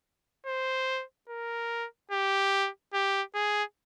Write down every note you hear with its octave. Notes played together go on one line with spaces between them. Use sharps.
C5
A#4
G4
G4
G#4